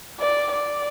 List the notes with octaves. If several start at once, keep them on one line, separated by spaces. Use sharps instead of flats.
D5
D5